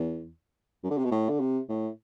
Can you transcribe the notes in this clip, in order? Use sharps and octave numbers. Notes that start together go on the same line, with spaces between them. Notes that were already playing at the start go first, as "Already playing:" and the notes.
Already playing: E2
F#2
D3
C3
B2
A2
D3
C3
A2